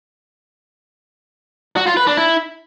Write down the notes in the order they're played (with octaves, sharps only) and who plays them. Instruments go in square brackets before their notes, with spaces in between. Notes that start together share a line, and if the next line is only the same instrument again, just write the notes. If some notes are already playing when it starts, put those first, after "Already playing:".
[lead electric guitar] F#4
F4
B4
D4
E4